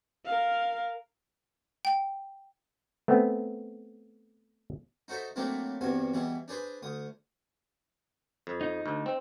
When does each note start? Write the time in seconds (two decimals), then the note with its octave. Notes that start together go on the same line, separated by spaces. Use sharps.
0.25 A#4 F5
1.85 G5
3.08 A3 B3 C4
5.08 D#4 F#4 A4 C5 E5
5.36 F#3 A3 A#3 C4 D4 E4
5.81 E2 G2 C3 F#4 G#5
6.13 B2 E3 G3 G#4
6.48 D4 G#4 B4 C5
6.82 D2 D#6
8.47 F2
8.61 D#4
8.86 D2
9.06 C4